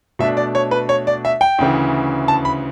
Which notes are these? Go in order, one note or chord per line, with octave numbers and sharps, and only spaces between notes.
B2 A3 D4 E5
D5
C#5
B4
C#5
D5
E5
G5
D2 C#3 E3
A5
B5